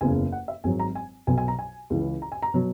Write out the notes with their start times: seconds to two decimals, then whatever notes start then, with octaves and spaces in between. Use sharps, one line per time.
0.01 F#1 E2 C#3 G#5
0.32 F#5
0.48 E5
0.64 G#1 G#2 F#3 G#5
0.79 A#5
0.95 G#5
1.27 B1 B2 F#3 G#5
1.38 G#5
1.48 A#5
1.59 G#5
1.90 C#2 C#3 E3
2.22 A#5
2.32 G#5
2.43 A#5
2.54 B2 F#3